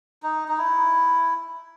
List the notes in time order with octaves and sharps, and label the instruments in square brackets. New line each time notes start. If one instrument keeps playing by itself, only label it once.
[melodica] D#4
D#4
E4